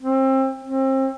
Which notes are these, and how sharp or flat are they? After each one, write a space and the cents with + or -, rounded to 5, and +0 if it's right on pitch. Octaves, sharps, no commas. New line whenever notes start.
C4 +30
C4 +30